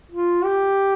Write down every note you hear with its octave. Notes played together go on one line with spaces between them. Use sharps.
F4
G4